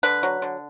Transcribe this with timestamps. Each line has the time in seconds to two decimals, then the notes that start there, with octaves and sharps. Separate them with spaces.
0.03 D3 B4
0.23 F#3
0.42 D3